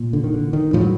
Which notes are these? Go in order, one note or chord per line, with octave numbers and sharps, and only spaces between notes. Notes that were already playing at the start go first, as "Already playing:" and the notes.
Already playing: A#2
D3
D#3
D3
D#3
A2 F3
F#3